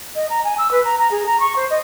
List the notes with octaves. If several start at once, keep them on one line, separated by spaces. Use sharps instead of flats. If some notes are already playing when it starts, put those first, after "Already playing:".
D#5
A#5
G#5
E6
B4
A#5
A#5
G#4
A#5
C#6
C5
D#5